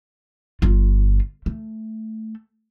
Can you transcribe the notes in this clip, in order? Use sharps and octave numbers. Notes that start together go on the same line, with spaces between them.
G1 F4
A3